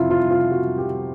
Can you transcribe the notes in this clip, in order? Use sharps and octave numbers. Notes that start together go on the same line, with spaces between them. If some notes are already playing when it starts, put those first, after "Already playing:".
Already playing: F2 C3 E4 F4
F4
F4
F#4
G4